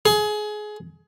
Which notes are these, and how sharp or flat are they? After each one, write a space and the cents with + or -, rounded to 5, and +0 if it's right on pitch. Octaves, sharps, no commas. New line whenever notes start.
G#4 +25